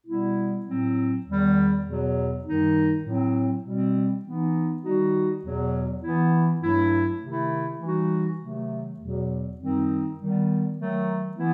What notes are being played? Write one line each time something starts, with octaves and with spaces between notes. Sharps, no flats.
B2 G3 B3 E4
A2 F#3 C4
E2 D#3 G3
E2 B2 F#3
F#2 D#3 G3 D#4
A2 F#3 C4
B2 G3 C4
E3 B3 D#4
D#3 G3 D#4 F#4
E2 B2 F#3
E3 B3 E4
G2 F#3 A3 E4
C3 D#3 A3 E4
E3 G3 D#4 F#4
C3 D#3 F#3 A3
E2 B2 F#3
F#2 D#3 G3 C4 D#4
D#3 G3 B3
D#3 F#3 A3
E3 B3 E4